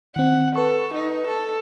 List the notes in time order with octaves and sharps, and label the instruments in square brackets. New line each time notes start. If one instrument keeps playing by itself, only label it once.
[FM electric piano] D#3 C4 [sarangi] F#5
[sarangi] A4 [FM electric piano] B4 C#6
[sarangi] D#4
A4